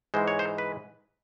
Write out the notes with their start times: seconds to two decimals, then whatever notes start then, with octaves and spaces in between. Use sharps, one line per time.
0.14 G#2 E3 G#3 C5
0.28 C#5
0.39 C5
0.58 B4